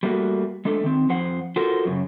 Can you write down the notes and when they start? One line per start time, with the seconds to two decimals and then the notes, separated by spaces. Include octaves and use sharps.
0.03 G3 A3 A#3 D#4 F#4
0.65 G#3 A3 D4 A4
0.84 D#3 C4
1.09 F2 F3 C5 F#5
1.56 F4 F#4 A4 A#4 C5
1.85 F#2 A2 C#3